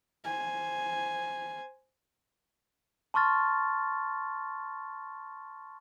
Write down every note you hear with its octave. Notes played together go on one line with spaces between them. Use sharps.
C5 G#5
A5 C6 C#6 F6 A6